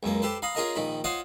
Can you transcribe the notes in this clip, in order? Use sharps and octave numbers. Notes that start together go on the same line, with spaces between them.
C#2 F#2 A#3
G4 A4 B4 C5
F5 A#5 B5 D#6
C#4 F4 G#4 A#4 D#5 A#5
A#1 D#3 B5
F4 C5 C#5 D#5 F5 F#5